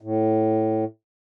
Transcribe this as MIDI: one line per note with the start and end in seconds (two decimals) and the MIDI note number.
0.01 0.85 45